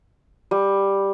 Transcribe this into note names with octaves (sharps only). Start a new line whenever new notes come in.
G3